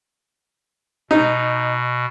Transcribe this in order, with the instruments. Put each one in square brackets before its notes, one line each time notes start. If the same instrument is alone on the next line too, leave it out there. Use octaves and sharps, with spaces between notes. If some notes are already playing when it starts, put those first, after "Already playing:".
[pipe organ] B2 [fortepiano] D#4